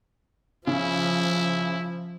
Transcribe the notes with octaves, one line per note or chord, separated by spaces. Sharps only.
C#3 F3 E4